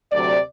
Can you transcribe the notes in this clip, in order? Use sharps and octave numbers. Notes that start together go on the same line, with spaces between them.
D2 C3 F#3 D5